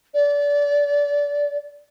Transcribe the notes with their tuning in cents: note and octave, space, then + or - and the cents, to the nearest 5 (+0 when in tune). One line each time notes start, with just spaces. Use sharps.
D5 -25